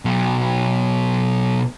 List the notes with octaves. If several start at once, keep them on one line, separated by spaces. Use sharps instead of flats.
B2 F#3